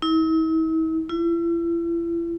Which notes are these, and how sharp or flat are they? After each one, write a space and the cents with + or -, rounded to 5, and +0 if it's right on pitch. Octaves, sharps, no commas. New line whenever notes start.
E4 -45
E4 +40